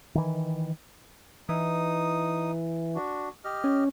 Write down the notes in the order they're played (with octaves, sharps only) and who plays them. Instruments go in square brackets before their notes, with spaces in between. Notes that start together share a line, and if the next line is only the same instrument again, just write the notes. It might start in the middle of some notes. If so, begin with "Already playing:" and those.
[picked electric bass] D#3 E3
[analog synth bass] E3 [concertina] D#4 D#6
[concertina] D4 F#4
G4 D#5 F6
[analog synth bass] C#4